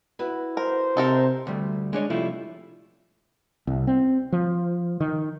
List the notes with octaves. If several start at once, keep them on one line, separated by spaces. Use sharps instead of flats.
E4 F#4 B4
A#4 C5
C3 D#4 A4 A#4
D2 G3 A3
G#3 D4 C#5 D#5
C3 F3 G3 A3 E4 F4
C2
C4
F3
D#3